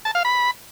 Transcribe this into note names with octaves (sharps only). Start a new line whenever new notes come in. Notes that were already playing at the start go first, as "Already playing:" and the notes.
A5
F5
B5